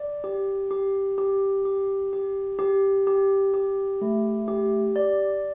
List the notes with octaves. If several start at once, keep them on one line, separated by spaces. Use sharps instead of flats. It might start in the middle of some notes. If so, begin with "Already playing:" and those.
Already playing: D5
G4
G4
G4
G4
G4
G4
G4
G4
A3
G4
D5